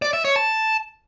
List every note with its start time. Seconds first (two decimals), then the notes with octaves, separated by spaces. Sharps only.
0.02 D5
0.13 E5
0.25 C#5
0.36 A5